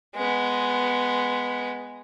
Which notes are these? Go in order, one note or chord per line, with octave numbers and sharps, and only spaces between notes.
G#3 B3